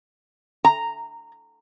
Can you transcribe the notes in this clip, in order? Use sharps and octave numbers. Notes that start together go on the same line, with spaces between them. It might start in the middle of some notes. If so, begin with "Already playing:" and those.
A#5